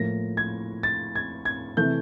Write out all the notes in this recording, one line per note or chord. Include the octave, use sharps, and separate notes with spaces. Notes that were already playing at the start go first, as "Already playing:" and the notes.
Already playing: A2 F3 A#3 A#6
G#6
A6
G#6
G#6
C3 E3 A3 G6